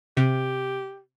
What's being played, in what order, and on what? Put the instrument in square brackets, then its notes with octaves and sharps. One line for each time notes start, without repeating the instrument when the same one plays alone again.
[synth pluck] C3 [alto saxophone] G4